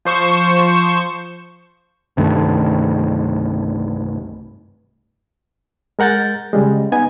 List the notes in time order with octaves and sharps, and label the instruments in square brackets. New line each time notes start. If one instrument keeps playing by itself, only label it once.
[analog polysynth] F3 C5 C#6 E7
[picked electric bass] C2 G2 D#3 A3
[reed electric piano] G#3 A#4 F#5 G6 A6
C#3 G3 G#3
B3 D#4 G#5